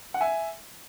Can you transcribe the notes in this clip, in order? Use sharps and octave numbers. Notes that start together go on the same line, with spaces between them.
F#5
E5 G#5